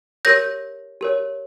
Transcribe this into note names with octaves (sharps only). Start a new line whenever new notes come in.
G4 A#4 C#5 G6 A#6
G4 A#4 C#5